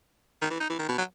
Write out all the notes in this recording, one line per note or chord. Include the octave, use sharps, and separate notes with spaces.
D#3
E3
D#4
E3
D#3
B2
F#3